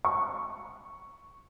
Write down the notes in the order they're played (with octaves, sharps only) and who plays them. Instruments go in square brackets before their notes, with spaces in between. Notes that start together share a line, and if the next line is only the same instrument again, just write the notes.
[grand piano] C#6